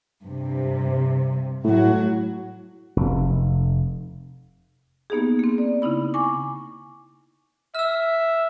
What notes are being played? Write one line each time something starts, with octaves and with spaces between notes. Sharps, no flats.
G2 C3
A2 F#3 F#4
F1
A#3 B3 D#4 G4 G#4
A#3 C4
D5
C#3 D#4 E4 B5
G#5 C#6 D6
E5 E6 F6